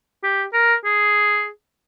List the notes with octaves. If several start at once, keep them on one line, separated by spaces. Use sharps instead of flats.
G4
A#4
G#4